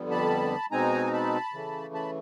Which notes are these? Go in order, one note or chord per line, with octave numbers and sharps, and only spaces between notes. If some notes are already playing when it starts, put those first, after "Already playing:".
Already playing: F2 D3 G3 B3
A5 B5
B2 G#3 C4 D#4 G#5 A#5
A#5
A5 B5
C#3 E3 A3
A5 B5